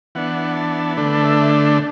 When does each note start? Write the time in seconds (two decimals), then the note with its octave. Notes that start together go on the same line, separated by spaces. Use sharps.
0.15 E3 B3 D4 F#5
0.56 A5
0.97 D3 A3 D4 B4
1.25 E5